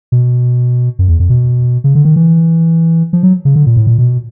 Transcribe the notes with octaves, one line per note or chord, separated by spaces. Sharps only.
B2
F#2
E2
F2
B2
C#3
D3
D#3
E3
F3
F#3
C#3
D3
A#2
A2
A#2
B2